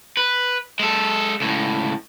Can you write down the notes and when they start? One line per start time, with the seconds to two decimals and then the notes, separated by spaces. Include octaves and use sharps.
0.17 B4
0.80 G#3 A4
1.40 C#2 A2